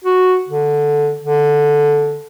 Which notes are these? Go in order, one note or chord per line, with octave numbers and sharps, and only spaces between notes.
F#4
D3
D3